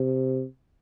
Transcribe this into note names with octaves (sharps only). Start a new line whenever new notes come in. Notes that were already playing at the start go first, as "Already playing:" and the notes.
Already playing: C3